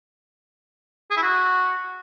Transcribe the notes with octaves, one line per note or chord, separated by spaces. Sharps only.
G#4
E4
F#4